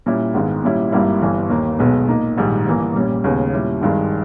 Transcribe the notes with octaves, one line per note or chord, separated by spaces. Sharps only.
A#2 G3 C#4 E4
G#1 G#2 D#3 G#3 B3
A#2 G3 C#4 E4
G#1 G2 G3 A#3 E4
G1 G2 E3 G3
D#2 D#3 A#3
B1 B2 G#3 B3
A#2 A#3 D#4
A#1 G#2 D#3 G3
G1 G2 E3 A#3
A#1 A#2 G3 C#4
D#2 C#3 G#3 B3
A#2 G3 C#4 E4
G#1 G2 D#3 G#3